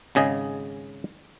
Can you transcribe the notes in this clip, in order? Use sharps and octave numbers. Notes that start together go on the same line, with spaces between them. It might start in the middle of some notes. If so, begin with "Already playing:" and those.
G#1 C#3 G#4 D#5